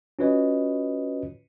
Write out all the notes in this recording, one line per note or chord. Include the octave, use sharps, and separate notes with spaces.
C#4 F4 F#4 B4 C#5 D#5